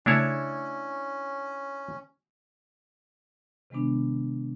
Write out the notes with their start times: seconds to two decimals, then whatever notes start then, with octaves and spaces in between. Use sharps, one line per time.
0.06 C#3 A3 C#4 D4 E4 C#5
3.70 C3 D#3 G#3 B3 D4